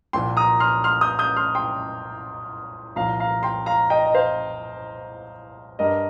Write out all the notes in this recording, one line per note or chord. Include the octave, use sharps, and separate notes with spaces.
C2 A#2 F3 G5 C6
A#5 D#6
C6 F6
C6 F6
D#6 G6
D#6 G6
C6 F6
G5 C6
C2 A#2 F3 F5 A#5
F5 A#5
G5 C6
F5 A#5
D#5 G5
D#5
C5 F5
G2 G3 A#4 D#5